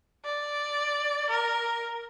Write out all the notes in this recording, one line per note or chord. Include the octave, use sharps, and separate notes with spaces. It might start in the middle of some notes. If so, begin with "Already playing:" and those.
D5
A#4